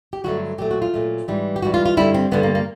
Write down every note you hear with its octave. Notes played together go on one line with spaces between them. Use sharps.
G4
G2 D3 F#3 A3 F#4
A#2 F#3 A3 G4
F#4
F4
A#2 F#3 A3
G#2 E3 G3
G4
G#2 E3 G3 F#4
F4
F4
G2 D3 G3 E4
C4
G2 D3 G3 B3
A#3
A#3